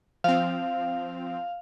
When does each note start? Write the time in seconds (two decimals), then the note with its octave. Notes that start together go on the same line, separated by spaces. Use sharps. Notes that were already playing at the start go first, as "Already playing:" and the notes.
0.24 F3 C4 F5